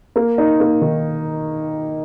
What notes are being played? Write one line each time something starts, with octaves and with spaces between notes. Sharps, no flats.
A#3
D#4
A#3
D#3